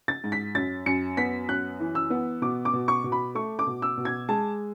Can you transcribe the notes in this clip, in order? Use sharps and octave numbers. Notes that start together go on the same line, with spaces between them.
A6
G#2
B6
F#2 A6
F#2 C#7
B3 B6
F#2 F#6
E3
E6
B3
B2 D6
D6
B2
C#6
B2
B5
A3 C#6
D6
B2
E6
B2
G#6
G#3 A5